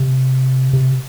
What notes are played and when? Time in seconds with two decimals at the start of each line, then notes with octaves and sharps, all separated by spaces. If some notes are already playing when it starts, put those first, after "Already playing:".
Already playing: C3
0.73 C3